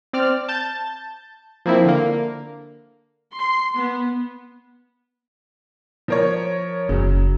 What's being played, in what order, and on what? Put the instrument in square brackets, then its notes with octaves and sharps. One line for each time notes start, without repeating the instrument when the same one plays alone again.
[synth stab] C4 D5 F6
A5 G6 A6
F3 A#3 C4 E4
D3 A#3
[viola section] C6
B3
[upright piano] F3 A#4 C#5
[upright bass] F#1 [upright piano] C#3 F#3